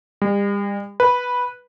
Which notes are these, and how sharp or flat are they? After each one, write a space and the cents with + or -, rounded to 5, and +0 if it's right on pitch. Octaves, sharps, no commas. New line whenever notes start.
G3 +40
B4 -5